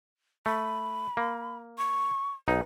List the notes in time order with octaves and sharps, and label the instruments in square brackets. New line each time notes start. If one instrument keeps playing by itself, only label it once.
[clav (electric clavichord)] A3 [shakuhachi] B5
[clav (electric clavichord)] A#3
[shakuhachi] C#6
[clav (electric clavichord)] B1 D#4 [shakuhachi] B4